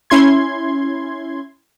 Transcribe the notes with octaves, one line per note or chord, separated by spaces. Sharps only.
C#4 E4 C6 G#6